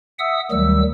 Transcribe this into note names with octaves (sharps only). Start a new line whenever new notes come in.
E5 F#5 D#6 E6
D2 D#3 F#3 G3 E6